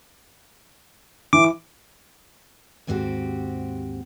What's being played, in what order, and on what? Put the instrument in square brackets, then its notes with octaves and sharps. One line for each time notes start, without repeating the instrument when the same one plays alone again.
[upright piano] E3 [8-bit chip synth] D6
[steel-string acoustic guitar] D#2 G#2 C4 F#4 G4